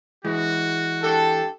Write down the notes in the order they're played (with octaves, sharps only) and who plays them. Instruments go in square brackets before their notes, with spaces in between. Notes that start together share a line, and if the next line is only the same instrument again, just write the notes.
[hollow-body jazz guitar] E3 G#3 [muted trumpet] F#4
[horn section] D4 G4 A4